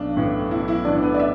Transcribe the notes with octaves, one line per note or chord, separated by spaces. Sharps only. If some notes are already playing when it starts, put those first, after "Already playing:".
Already playing: B1 D4
A2 E3
B1 E4
E4
A2 E3 D4 D5
B3 B4
D5
E5